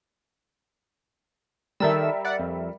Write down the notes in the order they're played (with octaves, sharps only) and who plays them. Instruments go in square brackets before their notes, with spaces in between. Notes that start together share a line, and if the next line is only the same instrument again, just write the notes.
[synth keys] D#3 A4 E6 [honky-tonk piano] G3 A#4 E5
[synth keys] D5 F#5
F2